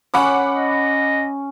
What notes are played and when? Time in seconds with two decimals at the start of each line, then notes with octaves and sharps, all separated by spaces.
0.14 C#4 F#5 B5 D6
0.53 D#5